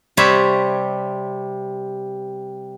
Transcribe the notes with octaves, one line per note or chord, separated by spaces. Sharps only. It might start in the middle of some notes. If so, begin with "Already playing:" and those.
C3 G3 C5 C#5 E5 B5